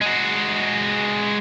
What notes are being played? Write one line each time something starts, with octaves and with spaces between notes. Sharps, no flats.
G#3 F#4